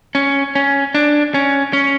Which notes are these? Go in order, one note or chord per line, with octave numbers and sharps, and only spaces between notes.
C#4
C#4
D4
C#4
C#4